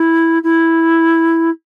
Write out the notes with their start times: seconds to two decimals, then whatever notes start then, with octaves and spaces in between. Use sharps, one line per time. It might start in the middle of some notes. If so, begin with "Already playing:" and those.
Already playing: E4
0.43 E4